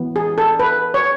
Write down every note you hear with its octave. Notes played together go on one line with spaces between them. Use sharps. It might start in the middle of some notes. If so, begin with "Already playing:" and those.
Already playing: E3 B3
G#4
A4
B4
C#5